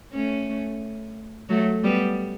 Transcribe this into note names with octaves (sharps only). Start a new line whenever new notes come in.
A3 C#4
F#3 A3
G3 B3